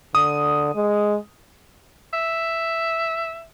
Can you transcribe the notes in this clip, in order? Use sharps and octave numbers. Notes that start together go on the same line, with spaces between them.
D3 D#6
G#3
E5